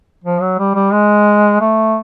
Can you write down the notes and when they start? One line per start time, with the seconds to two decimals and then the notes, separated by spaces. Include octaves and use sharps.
0.24 F3
0.41 F#3
0.58 G3
0.75 G3
0.92 G#3
1.61 A3